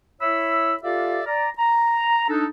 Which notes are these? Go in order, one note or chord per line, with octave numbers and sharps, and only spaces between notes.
E4 C#5 E5 B5 E6
F4 G4 A4 D5 E5 F5
D5 A#5
A#5
D4 D#4 A4